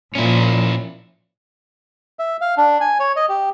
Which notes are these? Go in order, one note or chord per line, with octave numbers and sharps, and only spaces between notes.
A#2 F3 C#4 E4
E5
F5
D4
G#5
C#5
D#5
G4